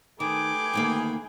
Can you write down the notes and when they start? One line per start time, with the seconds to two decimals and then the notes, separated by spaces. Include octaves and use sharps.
0.20 D#3 A3 G4 G#4 B4 G#5 D6
0.73 D2 D#3 A#3